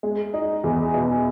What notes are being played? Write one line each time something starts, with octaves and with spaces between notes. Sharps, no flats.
G#3
D#4
E2
B2